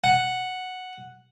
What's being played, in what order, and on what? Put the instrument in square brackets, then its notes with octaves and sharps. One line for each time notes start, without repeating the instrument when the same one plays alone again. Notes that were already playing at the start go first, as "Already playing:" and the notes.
[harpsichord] F#5